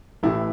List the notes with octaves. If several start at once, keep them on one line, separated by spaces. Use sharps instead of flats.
A1 A2 E3 E4